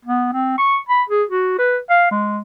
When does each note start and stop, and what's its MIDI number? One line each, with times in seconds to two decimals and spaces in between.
0.05 0.30 59
0.33 0.55 60
0.58 0.77 85
0.89 1.03 83
1.09 1.23 68
1.30 1.54 66
1.59 1.78 71
1.90 2.10 77
2.11 2.41 56